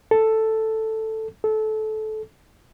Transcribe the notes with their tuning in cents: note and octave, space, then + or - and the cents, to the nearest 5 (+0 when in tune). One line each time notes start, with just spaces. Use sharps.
A4 +5
A4 -20